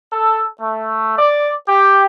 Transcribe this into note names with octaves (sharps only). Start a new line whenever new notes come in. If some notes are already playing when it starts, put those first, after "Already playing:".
A4
A3
D5
G4